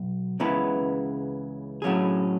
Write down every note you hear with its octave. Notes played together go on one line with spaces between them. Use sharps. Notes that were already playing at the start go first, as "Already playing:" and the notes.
Already playing: B1
C#2 C#3 E3 B3
A2 F#3 C#4 G#4